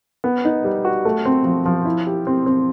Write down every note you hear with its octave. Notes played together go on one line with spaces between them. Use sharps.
B3
D#4
G3
F#4
A3
C4
F3
F3
E4
G4
C4
C4